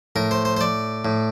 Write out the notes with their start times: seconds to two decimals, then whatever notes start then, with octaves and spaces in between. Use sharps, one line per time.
0.16 A2 A#4
0.31 C5
0.45 C5
0.57 C5
0.61 D5
1.05 A2